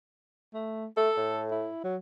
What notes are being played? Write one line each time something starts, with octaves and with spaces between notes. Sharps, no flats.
A3
A3 A4
A2
E4
F#3